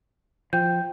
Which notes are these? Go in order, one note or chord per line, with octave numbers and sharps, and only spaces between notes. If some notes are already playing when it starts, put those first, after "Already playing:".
F3 G5 G6